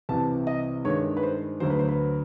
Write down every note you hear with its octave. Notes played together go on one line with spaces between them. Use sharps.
C2 C3 E3 A5
D#5
G2 D#3 G#3 C#5
B4
C5
D2 D3 F#3 C5
B4
C5
B4